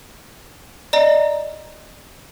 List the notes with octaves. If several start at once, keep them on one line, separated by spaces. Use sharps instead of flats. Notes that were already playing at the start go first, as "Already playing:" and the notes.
D5 D#5 A#5